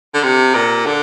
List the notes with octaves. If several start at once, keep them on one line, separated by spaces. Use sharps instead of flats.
D3
C3
A#2
D3